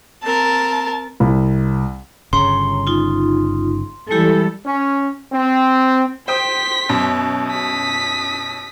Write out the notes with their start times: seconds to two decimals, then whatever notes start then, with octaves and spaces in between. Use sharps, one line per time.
0.23 C4 A#4 A5
1.20 C2
2.33 G1 C#3 C#5 A#5 C6
2.87 D#4 F4
4.11 E3 G3 G#3 E4 G4 A4
4.66 C#4
5.33 C4
6.28 C5 G5 C6 D#6 B6
6.89 F#2 B2
7.47 D#6 B6